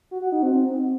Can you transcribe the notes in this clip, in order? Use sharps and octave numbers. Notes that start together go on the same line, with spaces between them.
F#4
F#4
D#4
C4